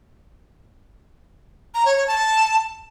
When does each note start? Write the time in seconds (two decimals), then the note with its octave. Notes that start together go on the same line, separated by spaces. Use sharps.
1.75 A#5
1.85 C#5
1.96 C#5
2.07 A5